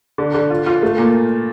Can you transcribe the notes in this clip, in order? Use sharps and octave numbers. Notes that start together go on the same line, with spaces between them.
D3
D3
F4
F4
A3
A#2